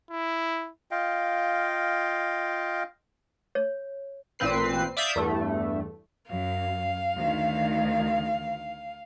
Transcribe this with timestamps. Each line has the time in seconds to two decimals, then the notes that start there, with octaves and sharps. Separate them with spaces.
0.11 E4
0.91 F4 D#5 F5 G5
3.55 C#5
4.39 A1 A#2 C4 B4 C7
4.97 D5 E5 F5 D#6 G6
5.16 E2 G2 A3
6.29 F#2 F5
7.13 D2 D#3